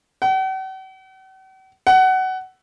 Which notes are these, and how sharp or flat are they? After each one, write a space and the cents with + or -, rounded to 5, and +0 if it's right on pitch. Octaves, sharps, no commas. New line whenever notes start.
F#5 +45
F#5 +20